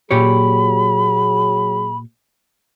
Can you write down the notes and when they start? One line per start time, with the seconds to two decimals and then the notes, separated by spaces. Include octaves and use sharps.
0.11 A#2 F#3 G4 G#4 C#5 B5